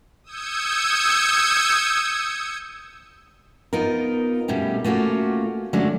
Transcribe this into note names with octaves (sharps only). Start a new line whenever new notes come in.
D#6 E6 G6 G#6 C#7
B3 D#4 F4 A#4
B2 G3 A3 C#4 G4
A3 A#3 C#4 F4 F#4
D3 F#3 G#3 A3 C#4 D4